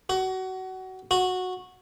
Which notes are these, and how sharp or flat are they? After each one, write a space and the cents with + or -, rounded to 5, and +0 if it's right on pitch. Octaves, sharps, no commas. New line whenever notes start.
F#4 +25
F#4 -10